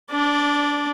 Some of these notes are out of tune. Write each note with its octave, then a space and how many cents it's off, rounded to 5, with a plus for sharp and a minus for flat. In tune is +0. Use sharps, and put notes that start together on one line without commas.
D4 -20 D5 +0